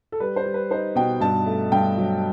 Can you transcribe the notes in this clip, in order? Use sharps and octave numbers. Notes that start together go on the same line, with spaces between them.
A4
G3 B4
C5
G3
B4
D#4 C5
B2 G5
G2 A5
A3
G2 G5
F#3